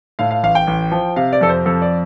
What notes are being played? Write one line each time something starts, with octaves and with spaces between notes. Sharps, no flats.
A2 F5
F5
A1 F5
G5
A1
F3
C3 F5
D5
F2 A4
C5
F2 A4
D5